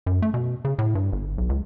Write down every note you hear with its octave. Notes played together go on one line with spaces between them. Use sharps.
F#2
A3
B2
C#3
A2
G2
G1
B1
C#2